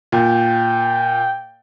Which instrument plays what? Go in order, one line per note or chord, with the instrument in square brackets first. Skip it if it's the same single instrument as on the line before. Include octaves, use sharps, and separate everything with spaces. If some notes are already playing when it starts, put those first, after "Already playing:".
[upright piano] A#2 [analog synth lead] G5